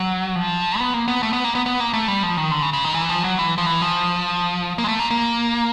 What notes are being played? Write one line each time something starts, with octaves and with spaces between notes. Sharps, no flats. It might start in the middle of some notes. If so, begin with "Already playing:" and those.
Already playing: F#3
F3
B3
A#3
B3
A3
B3
A#3
B3
B3
A#3
A3
G3
F3
D#3
D3
C#3
C#3
D#3
E3
F3
F#3
E3
F3
E3
F3
A#3
G#3
A3
A#3
A#3